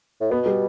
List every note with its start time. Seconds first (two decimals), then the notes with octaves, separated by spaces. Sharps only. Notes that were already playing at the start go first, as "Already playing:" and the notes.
0.20 A2
0.31 B2 B3
0.46 G3